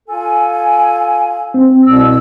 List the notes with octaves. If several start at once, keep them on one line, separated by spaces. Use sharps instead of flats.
F4 A4 G#5
C4
C2 B2 E6